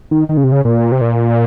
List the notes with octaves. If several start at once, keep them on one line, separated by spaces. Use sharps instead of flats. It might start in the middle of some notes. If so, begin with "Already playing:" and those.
D#3
D#3
C#3
C3
C#3
A#2
C3
A#2